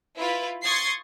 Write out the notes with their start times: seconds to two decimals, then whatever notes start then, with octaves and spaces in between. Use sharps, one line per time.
0.17 E4 F4 B4
0.63 C6 C#6 D#6 G#6 A6 C7